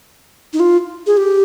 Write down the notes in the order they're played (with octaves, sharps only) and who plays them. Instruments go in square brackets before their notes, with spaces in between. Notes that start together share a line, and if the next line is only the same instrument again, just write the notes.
[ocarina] D#4
F4
G#4
G4